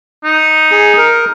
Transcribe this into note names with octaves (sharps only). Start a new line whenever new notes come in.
D#4
G#4
A#4